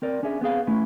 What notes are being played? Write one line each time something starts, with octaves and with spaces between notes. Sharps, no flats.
C4 A#4 D5
C#4 D4 G#4 E5
B3 C4 G#4 F5
A3 C#4 E4 B4